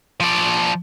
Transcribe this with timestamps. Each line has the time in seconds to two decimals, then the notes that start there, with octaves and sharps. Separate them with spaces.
0.20 F3 D5